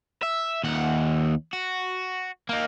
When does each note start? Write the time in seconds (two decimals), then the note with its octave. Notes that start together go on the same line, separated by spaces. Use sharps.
0.22 E5
0.63 D#2 F#5
1.53 F#4
2.49 A#3 D#4